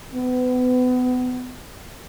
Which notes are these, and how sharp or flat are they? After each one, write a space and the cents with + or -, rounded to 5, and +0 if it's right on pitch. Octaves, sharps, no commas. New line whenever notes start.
B3 +30